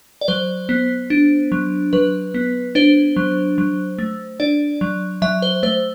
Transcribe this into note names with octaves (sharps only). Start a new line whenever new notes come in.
D5
F#3 C5
B3
D4
F#3
F#3 B4
B3
D4 C5
F#3
F#3
A3
D4 D5
F#3
F#3 E5
C5
A3 C5